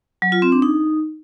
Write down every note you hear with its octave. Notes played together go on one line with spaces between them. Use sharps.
F#3
F4
C4
D4
D#4